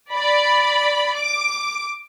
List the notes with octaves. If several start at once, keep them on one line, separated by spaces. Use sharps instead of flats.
D5 B5
D6